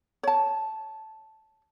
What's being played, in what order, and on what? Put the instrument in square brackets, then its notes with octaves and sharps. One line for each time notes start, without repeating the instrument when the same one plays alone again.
[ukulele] C#5 A5